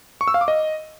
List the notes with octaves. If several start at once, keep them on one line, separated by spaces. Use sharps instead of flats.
C#6
E6
F5
D6
D#5